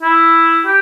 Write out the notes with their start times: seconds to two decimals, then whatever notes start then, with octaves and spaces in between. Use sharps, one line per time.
0.03 E4
0.66 G4